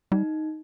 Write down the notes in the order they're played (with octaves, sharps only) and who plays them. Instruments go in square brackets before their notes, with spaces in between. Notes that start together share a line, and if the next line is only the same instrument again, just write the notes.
[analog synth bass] G3 [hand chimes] D#4